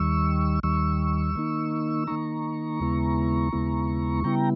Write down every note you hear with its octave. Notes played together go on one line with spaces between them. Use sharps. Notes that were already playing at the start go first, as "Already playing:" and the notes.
Already playing: D#2 D#3 G3 C#6 E6
D#2 D#3 G3 C#6 E6
D#3 A#3 D#4
D#3 A#3 D#4 A#5 C#6
D#2 C#3 G#3 B3 E4
D#2 C#3 G#3 B3 E4
C#3 G3 B3 E4 G5 A#5